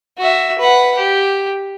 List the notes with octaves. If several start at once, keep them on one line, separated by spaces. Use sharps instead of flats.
F#4 E5
B4 F#5
G4